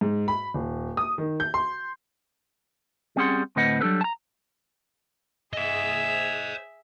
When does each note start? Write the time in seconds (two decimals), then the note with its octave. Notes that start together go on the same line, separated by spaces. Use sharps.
0.01 G#2
0.28 B5
0.54 D#1
0.97 D#6
1.18 D#3
1.40 G6
1.54 C6
3.16 G3 C4 C#4 G#4 F#5 C6
3.56 D2 A2 C4 B4 D#5 F#5
3.81 F#3 G3 D4 A4 B4
4.01 A5 A#5
5.53 G#4 C5 D#5 E5